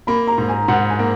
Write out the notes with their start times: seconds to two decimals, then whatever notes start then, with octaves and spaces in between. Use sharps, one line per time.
0.07 A#3 B5
0.27 A#5
0.38 G#2
0.48 G#5
0.68 G#2 F#5
0.89 G#5
0.99 A#3